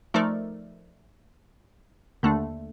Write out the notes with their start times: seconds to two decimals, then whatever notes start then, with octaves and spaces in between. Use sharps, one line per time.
0.14 F3 A3 D#4 A#4 D5
2.23 D#2 D3 A3 D4